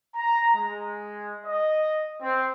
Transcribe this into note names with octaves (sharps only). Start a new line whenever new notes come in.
A#5
G#3
D#5
C4